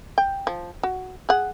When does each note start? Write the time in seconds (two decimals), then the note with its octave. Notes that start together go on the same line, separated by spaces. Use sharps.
0.18 G5
0.47 F3
0.83 F#4
1.29 G#4 F#5